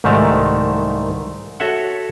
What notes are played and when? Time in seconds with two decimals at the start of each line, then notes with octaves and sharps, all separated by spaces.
0.04 C2 G#2 D#3 A3 A5 A#5
1.60 F#4 A4 C#5 E5 F#5